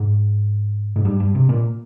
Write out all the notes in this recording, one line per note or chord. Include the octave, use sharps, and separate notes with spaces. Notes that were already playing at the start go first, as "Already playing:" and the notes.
Already playing: G#2
G#2
G2
G2
C3
A#2